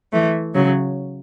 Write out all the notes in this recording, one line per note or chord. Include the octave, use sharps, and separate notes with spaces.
E3 A3
C#3 F#3